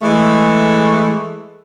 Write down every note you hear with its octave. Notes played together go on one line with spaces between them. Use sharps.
E3 G#3 A3